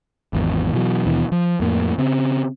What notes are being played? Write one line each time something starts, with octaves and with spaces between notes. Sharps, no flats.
G#1 E2
B2 E3 F#3
D#2 B2 E3
F3
F2 A2 A#3
C#3 C4